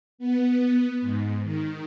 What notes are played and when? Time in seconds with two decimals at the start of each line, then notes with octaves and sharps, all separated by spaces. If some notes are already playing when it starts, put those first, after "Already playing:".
0.18 B3
1.01 G#2
1.43 D#3